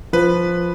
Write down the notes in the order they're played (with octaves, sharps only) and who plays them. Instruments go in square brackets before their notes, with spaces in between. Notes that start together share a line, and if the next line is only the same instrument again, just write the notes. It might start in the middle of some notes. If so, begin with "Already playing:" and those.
[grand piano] F3 [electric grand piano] B4